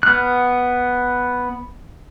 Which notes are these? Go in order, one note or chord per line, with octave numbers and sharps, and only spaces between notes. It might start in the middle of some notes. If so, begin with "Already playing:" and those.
B3 F6 F#6